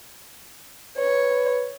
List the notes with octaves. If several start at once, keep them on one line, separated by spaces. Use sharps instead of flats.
B4 C#5